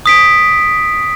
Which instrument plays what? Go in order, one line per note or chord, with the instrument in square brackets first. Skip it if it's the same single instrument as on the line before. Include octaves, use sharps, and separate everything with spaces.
[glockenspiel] D#6 B6 D7